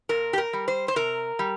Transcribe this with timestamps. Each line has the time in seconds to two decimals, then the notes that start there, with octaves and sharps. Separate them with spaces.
0.09 A#2 A#4
0.33 G4
0.38 A#4
0.53 G3
0.68 C5
0.88 C5
0.96 C3 A#4
1.39 G3